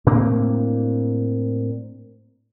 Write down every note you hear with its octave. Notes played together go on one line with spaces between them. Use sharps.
A2 A#3 C4 D4